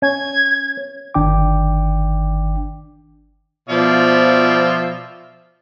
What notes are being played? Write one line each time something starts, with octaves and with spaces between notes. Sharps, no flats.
C#4 G#6
G1 D#3 D4 G5 D6
B2 F3 F4 D5 E5